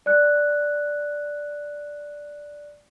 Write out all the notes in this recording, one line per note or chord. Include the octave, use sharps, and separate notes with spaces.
D5 F#6